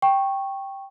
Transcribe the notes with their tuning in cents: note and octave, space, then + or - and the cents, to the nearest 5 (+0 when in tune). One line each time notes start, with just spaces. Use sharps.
G5 +0 C#6 -15